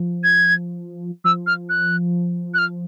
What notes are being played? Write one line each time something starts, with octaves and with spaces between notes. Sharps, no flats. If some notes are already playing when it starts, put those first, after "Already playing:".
Already playing: F3
G#6
F3 E6
F6
F#6
F#6
F6